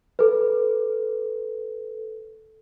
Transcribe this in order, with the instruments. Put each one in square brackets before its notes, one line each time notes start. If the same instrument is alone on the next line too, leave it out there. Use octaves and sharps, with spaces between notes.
[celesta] A4 B4